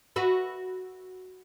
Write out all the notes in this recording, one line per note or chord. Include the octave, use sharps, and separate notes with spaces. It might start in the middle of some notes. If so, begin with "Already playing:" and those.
F#4 B4 E5